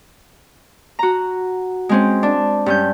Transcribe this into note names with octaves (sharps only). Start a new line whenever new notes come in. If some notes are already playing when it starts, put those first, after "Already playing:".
F#4 A#5
G#3 C4 C#4
D4
G2 C#4 G6